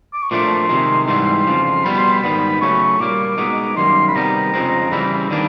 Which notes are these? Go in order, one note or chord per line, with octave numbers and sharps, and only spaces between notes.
D6
C#6
A#2 F3 A3 D4 C6
C3 D#3 G#3
G#2 E3 G3
F2 C#3 F3
B2 G3 B3 B5
C6
B5
G#2 D#3 G3 B3
C#3 F#3 A3 C#4 C#6
A#2 G3 A#3 D6
B2 G#3 B3 D#4
F#2 D#3 G3 A#3 C6
B5
C3 D#3 G3 B3 A#5
F2 C#3 F3 G#3 C4
C#3 E3 G3 C4 B5
D#3 G3 A#3 D4